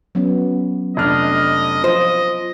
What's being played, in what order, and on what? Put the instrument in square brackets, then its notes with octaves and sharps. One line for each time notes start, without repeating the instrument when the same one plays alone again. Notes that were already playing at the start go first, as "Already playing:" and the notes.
[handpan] F#3 B3 C#4
[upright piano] F1 D4 F6 [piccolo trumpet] D#5
[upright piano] F3 [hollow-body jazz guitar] C5 [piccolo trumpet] D#5